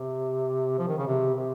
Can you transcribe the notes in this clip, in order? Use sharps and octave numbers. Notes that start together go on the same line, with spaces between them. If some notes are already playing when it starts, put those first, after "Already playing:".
Already playing: C3
F3
D#3
C#3
C3
C3